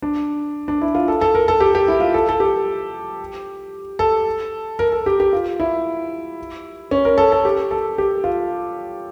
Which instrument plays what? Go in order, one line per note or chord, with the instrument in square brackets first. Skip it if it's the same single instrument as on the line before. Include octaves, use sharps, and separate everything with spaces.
[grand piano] D4
D4
E4
F4
A4
A4
A#4
A4
G4
G4
E4
F4
A4
A4
G4
A4
A#4
A4
G4
G4
F4
E4
C#4
A#4
A4
A4
G4
A4
G4
F4